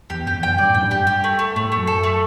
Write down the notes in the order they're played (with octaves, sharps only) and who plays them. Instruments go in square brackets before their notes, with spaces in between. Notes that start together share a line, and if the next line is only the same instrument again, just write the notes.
[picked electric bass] E2 [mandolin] G4
[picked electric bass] F#2 [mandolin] G4
[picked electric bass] E2
[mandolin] G5
[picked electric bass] F#2
[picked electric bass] G2 [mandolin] D5
[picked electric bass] A2
[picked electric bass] F#2 [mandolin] G5
[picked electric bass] G2
[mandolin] G4
G4
A3
A3
[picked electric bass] A2 [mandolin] A3
[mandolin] A3
[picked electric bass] F#2
[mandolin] A4
A3